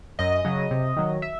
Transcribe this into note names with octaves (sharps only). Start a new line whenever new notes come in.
F#2 D#5
C#3 F#3
C3
D#3 F#3
E5